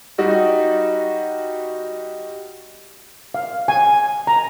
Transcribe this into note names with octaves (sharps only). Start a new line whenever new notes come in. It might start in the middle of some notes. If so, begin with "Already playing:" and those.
G3 D#4 F#4
F5
G#5
A#5